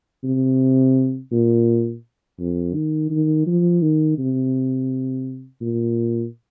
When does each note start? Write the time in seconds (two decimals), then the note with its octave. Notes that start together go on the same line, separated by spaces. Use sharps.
0.24 C3
1.31 A#2
2.39 F2
2.74 D#3
3.11 D#3
3.46 F3
3.82 D#3
4.18 C3
5.61 A#2